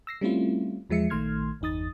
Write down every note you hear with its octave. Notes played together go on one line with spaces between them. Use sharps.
E6 A#6 C7
G3 A3 C4 C#4 E4 F4
E2 F3 G#3 E5 C#7
A#1 D#3 A3 C6 F6 G#6
G1 E2 D#4 D#6 A6